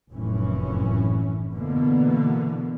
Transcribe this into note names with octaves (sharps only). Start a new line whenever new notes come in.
F1 F#2 A2 E3 C#4
B2 D3 E3 A#3 B3